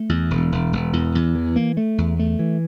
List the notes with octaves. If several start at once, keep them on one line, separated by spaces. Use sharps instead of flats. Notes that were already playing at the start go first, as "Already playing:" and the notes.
Already playing: A3
E2
E1
E1
E1
E2
E2
E3
A#3
A3
E2
A3
E3